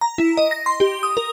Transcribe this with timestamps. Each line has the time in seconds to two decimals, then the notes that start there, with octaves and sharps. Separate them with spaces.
0.01 A#5
0.18 E4
0.37 D#5
0.51 A#6
0.66 C6
0.80 G4
1.03 D#6
1.17 A#4